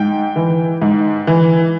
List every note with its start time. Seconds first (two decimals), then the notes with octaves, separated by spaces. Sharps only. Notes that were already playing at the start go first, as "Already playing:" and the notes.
Already playing: G#2 G5
0.36 E3
0.82 G#2
1.27 E3